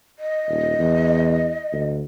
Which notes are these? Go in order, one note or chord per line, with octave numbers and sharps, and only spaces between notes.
D#5
D#1
E2
D2